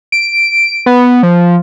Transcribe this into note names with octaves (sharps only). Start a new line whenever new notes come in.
D7
B3
F3